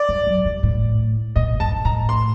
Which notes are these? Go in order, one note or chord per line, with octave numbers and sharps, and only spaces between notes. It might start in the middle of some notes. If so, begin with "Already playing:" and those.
Already playing: D5
G2
F#2
G2
A2
A#2 D#5
G2 A5
A2 A#5
C6